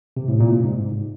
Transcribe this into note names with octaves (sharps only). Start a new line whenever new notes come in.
C3
A2
A#2
C3
G#2